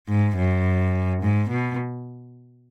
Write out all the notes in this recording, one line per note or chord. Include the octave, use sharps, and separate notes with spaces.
G#2
F#2
G#2
B2